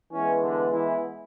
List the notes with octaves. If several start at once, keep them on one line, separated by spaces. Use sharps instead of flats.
E3 G#3 B3 C#4
D3 D4
E3 E4